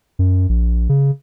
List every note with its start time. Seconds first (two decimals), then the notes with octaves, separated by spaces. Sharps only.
0.19 F#2
0.49 A#1
0.89 C#3